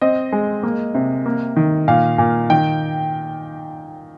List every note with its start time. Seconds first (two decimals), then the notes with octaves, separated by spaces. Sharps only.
0.01 C4 D#5
0.32 G#3
0.63 A#3
0.94 C3
1.26 A#3
1.56 D#3
1.88 A#2 F5
2.18 A#2
2.50 D#3 G5